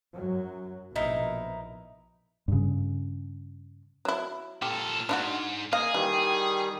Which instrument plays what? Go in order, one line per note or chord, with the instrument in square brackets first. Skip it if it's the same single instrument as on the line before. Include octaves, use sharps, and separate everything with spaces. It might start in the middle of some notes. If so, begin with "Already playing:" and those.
[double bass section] F#2 F#3
[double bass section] A#1 B2 [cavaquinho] D#4 E4 A#4
[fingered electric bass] G2 C#3
[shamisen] F#3 E4
[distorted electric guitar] A#2 A4 [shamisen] G4 [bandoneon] F6
[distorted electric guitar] G#2 [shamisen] D4 E4 F#4
[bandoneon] A#3 D#5 [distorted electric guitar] G#4 [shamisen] F5
[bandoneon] D#3 G3 [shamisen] E3